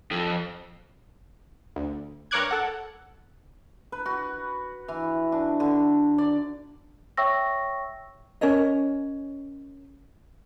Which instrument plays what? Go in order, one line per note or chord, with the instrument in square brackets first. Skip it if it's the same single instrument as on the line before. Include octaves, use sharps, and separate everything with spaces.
[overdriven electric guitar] F2
[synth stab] D2
G2 A#4 C#5 D6 F#6 G#6
A4 F#5
[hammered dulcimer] B4
F#4
E3
D4
D3
D5
[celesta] C#5 E5 G5 C#6 E6 A#6
[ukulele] C#4 A#4 C#5 D#5